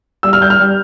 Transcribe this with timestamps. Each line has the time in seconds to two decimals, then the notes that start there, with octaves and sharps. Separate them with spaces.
0.23 G3 E6
0.33 F6
0.41 G3 G6
0.50 F6
0.59 G3